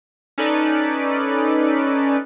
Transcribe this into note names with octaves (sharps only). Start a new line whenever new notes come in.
C#4 D#4 A4 B4 D5